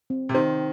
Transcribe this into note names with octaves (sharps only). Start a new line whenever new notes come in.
C4
C3
D#3 C5